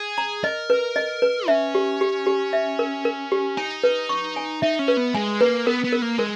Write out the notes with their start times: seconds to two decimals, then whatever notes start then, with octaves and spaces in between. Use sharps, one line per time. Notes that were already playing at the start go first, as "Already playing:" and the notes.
Already playing: G#4
0.18 A#5
0.44 A#4 D#5
0.70 B4
0.96 D#5
1.22 B4
1.48 C#4 E5
1.75 G4
2.01 G4
2.26 G4
2.53 E5
2.79 A#4
3.05 A#4
3.32 G4
3.57 D#4 G#5
3.83 B4
4.09 C#6
4.36 G#5
4.62 D#4 E5
4.79 C#4
4.88 B4
4.97 B3
5.14 G#3 G#5
5.41 A#3 B4
5.66 B3 A#4
5.84 B3
5.93 A#4
6.02 A#3
6.19 G#3 A#4